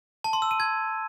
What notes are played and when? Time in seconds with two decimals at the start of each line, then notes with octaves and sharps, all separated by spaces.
0.24 A5
0.33 C6
0.42 E6
0.51 D#7
0.60 G#6